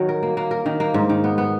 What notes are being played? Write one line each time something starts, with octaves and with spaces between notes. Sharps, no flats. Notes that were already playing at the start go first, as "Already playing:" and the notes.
Already playing: D#3 F#3
A#4
A#3
A#3
A#4
D#3
A#3
G#2
D#3
B3
B3